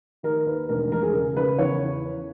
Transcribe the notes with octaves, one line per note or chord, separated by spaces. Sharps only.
D#3 A#4
D#2 B4
E1 A#4
E1 A#4
G#4
C#3 A#4
C#3 B4
E2 C#5